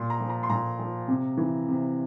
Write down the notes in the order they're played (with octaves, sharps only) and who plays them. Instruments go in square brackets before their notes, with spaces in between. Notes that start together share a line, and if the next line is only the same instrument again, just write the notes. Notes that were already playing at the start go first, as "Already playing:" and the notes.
Already playing: [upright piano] A#2 C6
A#5
F3
A#5
C6
A#2 A#5
F3
C3
E3
C3